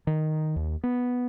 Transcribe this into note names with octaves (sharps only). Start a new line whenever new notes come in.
D#3
D#2
B3